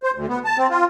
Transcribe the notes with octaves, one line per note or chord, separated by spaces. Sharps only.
C5
D2
B3
A5
C4
F4